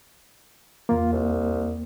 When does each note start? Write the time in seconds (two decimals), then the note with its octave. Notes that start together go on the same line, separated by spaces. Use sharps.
0.89 E2 A#3 F4
1.13 C2